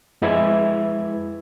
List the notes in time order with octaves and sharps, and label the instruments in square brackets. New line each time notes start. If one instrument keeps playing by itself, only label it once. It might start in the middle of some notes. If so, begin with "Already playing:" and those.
[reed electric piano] F2 G#3 E4 B4 E5 G#6